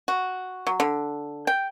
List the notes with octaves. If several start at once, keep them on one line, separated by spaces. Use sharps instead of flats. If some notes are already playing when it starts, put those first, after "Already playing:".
F#4
F#3
D3
G5